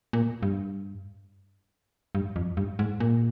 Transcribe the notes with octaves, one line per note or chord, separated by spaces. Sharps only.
A#2
G2
G2
F2
G2
G#2
A#2